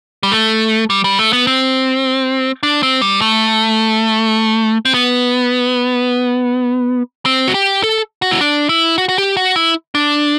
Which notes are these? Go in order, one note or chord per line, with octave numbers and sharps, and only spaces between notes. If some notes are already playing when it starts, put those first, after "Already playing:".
G3
A3
G3
G3
A3
B3
C4
D4
C4
G3
A3
C4
B3
C4
F#4
G4
A4
F#4
E4
D4
E4
F#4
F#4
G4
F#4
E4
D4